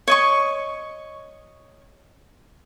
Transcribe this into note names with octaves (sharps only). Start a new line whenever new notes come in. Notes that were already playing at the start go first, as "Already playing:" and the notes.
C#5 D#5 C#6